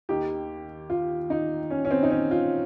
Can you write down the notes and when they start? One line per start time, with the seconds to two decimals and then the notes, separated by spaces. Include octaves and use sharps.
0.09 D#2 D#3 G4
0.90 F4
1.30 D#4
1.70 C#4
1.85 C#4
1.91 C4
2.03 D#4
2.11 C#4
2.31 F4